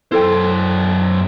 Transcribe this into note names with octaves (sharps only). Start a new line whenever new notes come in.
F#2 E4 A4 C5 G5